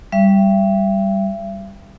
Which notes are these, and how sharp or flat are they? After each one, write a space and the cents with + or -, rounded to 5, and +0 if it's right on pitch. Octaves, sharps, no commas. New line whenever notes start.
G3 +0 E5 +40